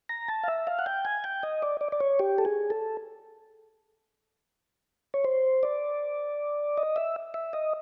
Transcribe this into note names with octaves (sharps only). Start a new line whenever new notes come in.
A#5
A5
F5
E5
F5
F#5
G5
G#5
G5
D#5
D5
D5
D5
C#5
G4
A4
G#4
A4
C#5
C5
D5
D#5
E5
E5
D#5